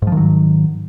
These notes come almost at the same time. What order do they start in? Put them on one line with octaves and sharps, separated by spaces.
G#2 F3 D#3 F#3